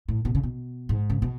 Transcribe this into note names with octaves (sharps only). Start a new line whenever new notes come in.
A2
B2
C#3
B2
G#2
C#3
B2